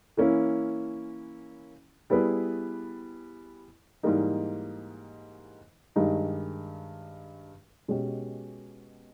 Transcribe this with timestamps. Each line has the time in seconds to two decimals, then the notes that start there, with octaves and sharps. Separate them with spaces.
0.17 E3 A#3 C#4 E4
2.10 G3 B3 E4 G#4 B4
4.03 G#2 E3 G3 A#3 D#4
5.96 G2 D#3 G#3 D#4 G4
7.88 B2 G#3 C#4 G4